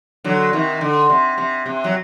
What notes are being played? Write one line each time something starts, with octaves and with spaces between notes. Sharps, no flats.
D3 F#3
C3 D#3
D3
C3
C3
C3
F#3